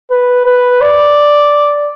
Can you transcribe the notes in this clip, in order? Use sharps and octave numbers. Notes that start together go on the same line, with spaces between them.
B4
B4
D5